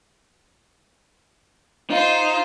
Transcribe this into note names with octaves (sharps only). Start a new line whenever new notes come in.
D#4 F4 C5